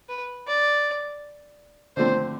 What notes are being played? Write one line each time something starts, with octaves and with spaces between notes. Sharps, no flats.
B4
D5
D3 F3 A3 C4 C5